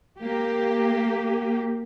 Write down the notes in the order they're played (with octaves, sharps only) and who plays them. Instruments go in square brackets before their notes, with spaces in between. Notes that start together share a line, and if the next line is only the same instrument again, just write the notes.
[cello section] A#3 G4